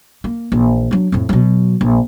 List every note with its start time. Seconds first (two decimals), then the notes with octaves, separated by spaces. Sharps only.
0.24 A#3
0.52 A#1 E3
0.91 F#3 D4
1.12 F2 A2
1.29 B2 F#3
1.81 A#1